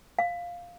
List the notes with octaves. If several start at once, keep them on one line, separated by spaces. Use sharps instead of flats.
F5